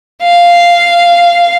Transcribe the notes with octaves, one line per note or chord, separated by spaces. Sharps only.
F5